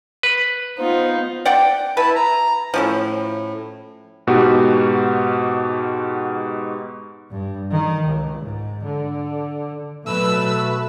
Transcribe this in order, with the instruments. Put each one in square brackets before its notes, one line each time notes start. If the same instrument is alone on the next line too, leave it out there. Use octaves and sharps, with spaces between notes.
[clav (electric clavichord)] B4
[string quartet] B3 D#4 F4 [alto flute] C5
[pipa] D5 F#5 G5
[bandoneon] E4 A5 B5 [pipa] B4
[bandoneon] A#5
[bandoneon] A2 [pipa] F3 C#4 E4
[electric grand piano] G#2 B2 F#4 G4
[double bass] G2
D#3
C#2
G#2
D3
[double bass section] B2 F#3 [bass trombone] A3 [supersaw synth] B4 [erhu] E6